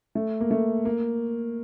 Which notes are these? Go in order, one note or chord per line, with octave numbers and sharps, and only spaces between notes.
A3
A#3
A3
A#3